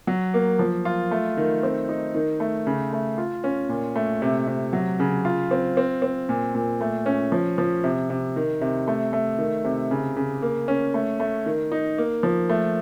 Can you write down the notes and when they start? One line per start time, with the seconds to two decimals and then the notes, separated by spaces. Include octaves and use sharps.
0.07 F#3
0.34 A#3
0.59 F3
0.85 F4
1.11 A3
1.37 D#3
1.63 C4
1.89 D#4
2.14 D#3
2.40 A3
2.67 C#3
2.93 A3
3.18 F4
3.44 C#4
3.69 A#2
3.96 A3
4.22 C3
4.47 C3
4.73 F#3
5.00 C#3
5.25 F4
5.51 C4
5.77 C4
6.02 C4
6.29 A#2
6.55 A#2
6.81 A3
7.06 C#4
7.32 F3
7.58 F3
7.84 C3
8.10 C3
8.36 D#3
8.61 C3
8.88 A3
9.13 A3
9.38 D#3
9.64 C3
9.91 C#3
10.16 C#3
10.42 A#3
10.68 C#4
10.94 A3
11.20 A3
11.46 D#3
11.72 D#4
11.98 A#3
12.23 F3
12.49 A3